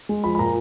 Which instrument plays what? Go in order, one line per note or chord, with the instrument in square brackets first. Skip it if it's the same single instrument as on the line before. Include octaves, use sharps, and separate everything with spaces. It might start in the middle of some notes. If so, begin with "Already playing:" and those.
[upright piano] G#3
F3 B5
B5
A#2 A#5